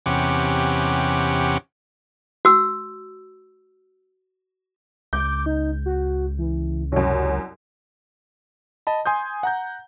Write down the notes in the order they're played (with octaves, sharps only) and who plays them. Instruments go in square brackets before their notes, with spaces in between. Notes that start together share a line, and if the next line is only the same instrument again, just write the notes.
[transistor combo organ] E2 C3 C#4 G4 F#5
[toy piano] F#4 E6
[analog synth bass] C#2 [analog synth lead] D6 [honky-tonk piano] G6
[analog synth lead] D#4
F#4
E3
[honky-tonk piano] C2 F#2 [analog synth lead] C#5
[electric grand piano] D#5 A5 B5
G#5 C6 D#6 G6
F#5 A#5 G6